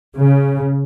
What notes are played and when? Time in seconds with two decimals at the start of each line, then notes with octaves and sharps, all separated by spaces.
0.17 C#3